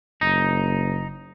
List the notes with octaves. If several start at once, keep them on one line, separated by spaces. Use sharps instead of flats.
F#1 D#4